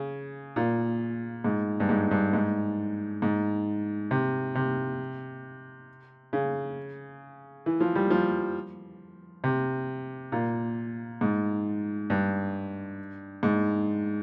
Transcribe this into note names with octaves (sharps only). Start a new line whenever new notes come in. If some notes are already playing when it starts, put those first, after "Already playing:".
Already playing: C#3
A#2
G#2
G2
G#2
G2
G#2
G#2
C3
C3
C#3
E3
F3
G3
F3
C3
A#2
G#2
G2
G#2